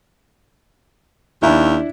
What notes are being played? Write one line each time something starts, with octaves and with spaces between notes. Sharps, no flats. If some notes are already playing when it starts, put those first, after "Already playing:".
D#2 D4 E4